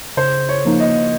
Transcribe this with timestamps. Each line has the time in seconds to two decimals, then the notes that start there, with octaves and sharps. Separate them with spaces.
0.17 C#3 C5
0.49 C#5
0.65 F3 A#3 D#4
0.80 D#5